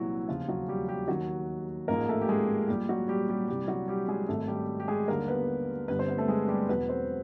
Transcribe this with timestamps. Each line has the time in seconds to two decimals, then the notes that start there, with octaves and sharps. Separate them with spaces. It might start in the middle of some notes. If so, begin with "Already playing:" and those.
Already playing: C2 A#2 E3 F#3 G3 E4 F#4
0.28 E1 D#2 C#3 F3 F4
0.48 F#3 F#4
0.68 G3 G4
0.88 G3 G4
1.08 D#2 D#3 F#3 F#4
1.88 A1 G#2 F3 G#3 A#3 A#4
2.09 A3 A4
2.21 G4
2.29 G#3 G#4
2.68 A#1 A#2 F3 G3 G4
2.89 F#3 F#4
3.08 G3 G4
3.29 G3 G4
3.48 C2 C3 E3 G3 G4
3.68 F#3 F#4
3.88 G3 G4
4.08 G#3 G#4
4.28 G#1 G#2 D#3 F#3 A3 A4
4.48 G3 G4
4.80 G4
4.88 G#3 G#4
5.08 D#2 D3 G3 A#3 A#4
5.28 B3 B4
5.88 G1 G2 D3 G3 B3 B4
5.99 C4 C5
6.08 B3 B4
6.18 A3 A4
6.28 G#3 G#4
6.48 G3 G4
6.68 E1 E2 B2 F#3 B3 B4
6.89 C4 C5